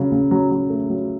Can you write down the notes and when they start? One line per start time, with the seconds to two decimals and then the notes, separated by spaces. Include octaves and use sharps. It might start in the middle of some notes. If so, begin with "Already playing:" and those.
Already playing: C#3 F#3
0.12 C#3
0.31 F#3
0.51 F#3
0.70 A3
0.90 F#3